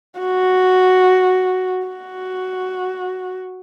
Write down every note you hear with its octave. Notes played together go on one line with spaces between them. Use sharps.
F#4
F#4